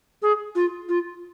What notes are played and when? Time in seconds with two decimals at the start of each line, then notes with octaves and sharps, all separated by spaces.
0.22 G#4
0.55 F4
0.89 F4